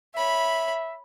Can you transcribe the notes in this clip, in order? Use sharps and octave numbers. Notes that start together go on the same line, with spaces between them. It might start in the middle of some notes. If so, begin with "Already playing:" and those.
C#5 E5 B5